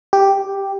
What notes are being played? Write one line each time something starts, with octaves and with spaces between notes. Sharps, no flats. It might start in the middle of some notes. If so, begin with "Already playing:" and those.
G4